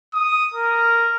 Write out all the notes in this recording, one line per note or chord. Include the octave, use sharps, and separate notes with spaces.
D#6
A#4